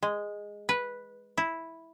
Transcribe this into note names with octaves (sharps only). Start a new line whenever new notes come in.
G#3
B4
E4